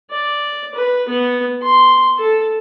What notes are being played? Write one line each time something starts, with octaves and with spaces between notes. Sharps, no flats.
D5
B4
B3
C6
A4